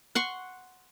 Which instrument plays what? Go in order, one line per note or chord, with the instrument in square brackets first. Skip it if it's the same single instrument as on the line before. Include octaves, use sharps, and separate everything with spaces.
[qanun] F#5 C6 C#6